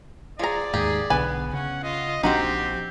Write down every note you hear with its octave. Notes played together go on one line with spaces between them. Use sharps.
F3 G#4 D5 A#5
D#2 G#2 A#3 G4 G#4
B1 D3 B3 B4 G#5
C#3 C#4 F#5
F4 D#5
A#1 F3 C4 D4 D#4 F#4 G4 C5